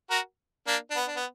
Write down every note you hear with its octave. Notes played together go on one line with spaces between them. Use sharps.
F#4 A#4
A#3 D4
D4
B3
D4
B3